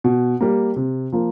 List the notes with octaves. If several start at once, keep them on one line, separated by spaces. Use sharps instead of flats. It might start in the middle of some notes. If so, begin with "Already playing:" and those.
B2
G3 A#3
C3
F3 A#3